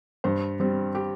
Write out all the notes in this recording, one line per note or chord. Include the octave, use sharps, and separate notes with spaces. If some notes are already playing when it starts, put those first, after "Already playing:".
G2 C5
G3 C4
G4